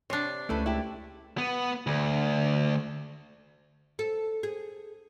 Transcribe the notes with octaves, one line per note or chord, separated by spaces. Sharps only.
C3 D4 C#5
C#2 A3 E4 A4 B4
E4 G4
B3
D2
A4
G#4